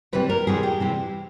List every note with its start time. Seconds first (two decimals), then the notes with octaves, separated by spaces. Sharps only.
0.13 C3 E3 G3 B4
0.29 A#4
0.47 C3 E3 G3 G#4
0.63 G4
0.80 C3 E3 G3